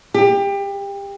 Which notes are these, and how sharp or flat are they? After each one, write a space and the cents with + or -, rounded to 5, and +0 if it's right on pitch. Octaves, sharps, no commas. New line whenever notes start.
G4 +25